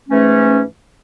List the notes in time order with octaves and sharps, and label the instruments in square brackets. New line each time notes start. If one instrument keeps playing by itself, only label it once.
[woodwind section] G#2 E3 A3 C#4